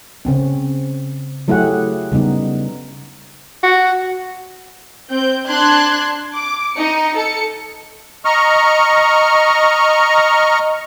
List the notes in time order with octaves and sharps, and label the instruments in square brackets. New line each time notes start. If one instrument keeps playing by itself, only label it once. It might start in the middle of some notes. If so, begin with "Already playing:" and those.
[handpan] C#3 C4 C#4
F#3 A3 E4 G4 G#4 F#5
C#3 G3 B3 D#4
[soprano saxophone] F#4
[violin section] C4 G6
D4 C6 F#6 G#6
D6
D#4 C#7
A4 C#7
[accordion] D#5 A#5 C#6 F6